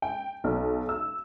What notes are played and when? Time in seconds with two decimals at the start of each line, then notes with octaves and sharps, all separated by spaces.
0.02 G5
0.44 B1
0.89 E6